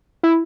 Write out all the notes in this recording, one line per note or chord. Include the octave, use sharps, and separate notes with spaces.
E4